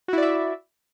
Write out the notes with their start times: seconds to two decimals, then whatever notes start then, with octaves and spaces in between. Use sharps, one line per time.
0.08 F#4
0.13 E4
0.18 D5
0.22 E5